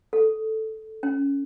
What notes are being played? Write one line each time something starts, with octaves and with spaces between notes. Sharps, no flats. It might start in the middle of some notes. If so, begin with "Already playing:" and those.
A4
C#4